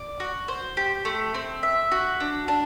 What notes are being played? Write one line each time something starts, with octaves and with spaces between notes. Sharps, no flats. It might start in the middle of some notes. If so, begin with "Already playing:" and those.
Already playing: D5
F#4
C5
G4
A3
C4
E5
F#4
D4
D4